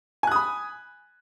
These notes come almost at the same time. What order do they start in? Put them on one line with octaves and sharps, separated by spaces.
G#5 F#6 D#6 B5